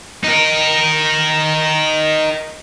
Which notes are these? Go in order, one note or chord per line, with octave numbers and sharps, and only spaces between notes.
D#4 A#4